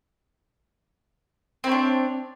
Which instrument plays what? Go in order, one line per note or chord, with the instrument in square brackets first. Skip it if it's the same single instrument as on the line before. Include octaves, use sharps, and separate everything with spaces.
[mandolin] C4
E4
C#5
D4